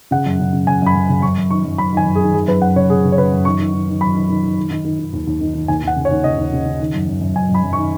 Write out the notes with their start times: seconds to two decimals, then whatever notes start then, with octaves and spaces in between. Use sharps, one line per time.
0.11 C#3 F#5
0.26 F#2
0.40 C#3
0.53 C#3
0.67 C#3 G#5
0.82 F#2 B5
0.96 F#2
1.09 C#3
1.22 F#2 C#6
1.38 F#2
1.51 D#3 C#6
1.65 F#2
1.78 F#2 B5
1.93 D#3 G#5
2.06 F#2
2.15 G#4
2.21 D#3
2.34 F#2 G#4
2.48 F#2 B4
2.62 F#2 F#5
2.76 C#3 C#5
2.90 C#3 G#4
3.04 C#3
3.12 C#5
3.17 C#3 B4
3.32 F#2
3.45 D#3 C#6
3.59 D#3
3.73 D#3
3.88 D#3
4.01 F#2 B5
4.15 D#3
4.29 D#3
4.44 D#3
4.58 D#3
4.70 D#3
4.85 D#3
4.99 D#3
5.13 D#2
5.27 D#2
5.41 D#3
5.54 D#3
5.68 D#2 G#5
5.83 D#2 F#5
5.96 C#3
6.05 C#5
6.11 D#2
6.24 C#3 D#5
6.38 D#2
6.53 C#3
6.66 C#3
6.80 D#3
6.94 F#2
7.07 F#2
7.21 F#2
7.36 F#2 G#5
7.49 F#2
7.54 B5
7.63 F#2
7.73 D#3 C#6